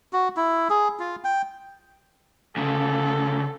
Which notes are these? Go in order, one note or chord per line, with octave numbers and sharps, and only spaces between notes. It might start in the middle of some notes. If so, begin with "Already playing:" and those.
F#4
E4
G#4
F4
G5
D2 C#3 A4